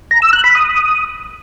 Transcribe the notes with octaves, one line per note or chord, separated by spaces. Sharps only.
A#5
E6
F#6
B5
D#6